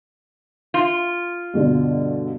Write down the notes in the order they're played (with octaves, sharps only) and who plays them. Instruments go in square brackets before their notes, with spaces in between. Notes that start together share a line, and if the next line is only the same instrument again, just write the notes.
[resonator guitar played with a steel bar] F4
[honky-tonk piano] G2 B2 D3